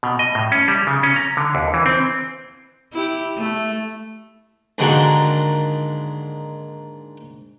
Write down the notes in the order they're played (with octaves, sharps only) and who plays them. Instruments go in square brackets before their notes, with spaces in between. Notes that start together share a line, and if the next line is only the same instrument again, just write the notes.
[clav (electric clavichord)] B2
D#5
A2
C#4
G3
C#3
C#4
A#5
D3
D#2
E3
C4
[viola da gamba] E4 G4
A3
[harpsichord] G#2 D3 D#3 G#3 A#3 F#4